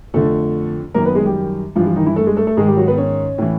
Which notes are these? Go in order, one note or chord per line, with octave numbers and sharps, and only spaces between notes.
F2 D3 A3 A4
F#2 D#3 A#3 A#4
B3 B4
G#3 G#4
G3 G4
G2 E3 F3 F4
F3 F4
D#3 D#4
E3 E4
A3 A4
G#3 G#4
A3 A4
A3 A4
G#2 D#3 G#3 G#4
G3 G4
F#3 F#4
B3 B4
C#4 C#5
A2 E3